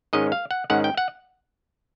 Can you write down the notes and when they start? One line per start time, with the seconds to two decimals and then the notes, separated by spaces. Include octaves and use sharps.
0.13 G#2 D#3 G#3 C#4 D#5
0.32 F5
0.51 F#5
0.70 G#2 D#3 G#3 C#4 F#5
0.84 G5
0.97 F#5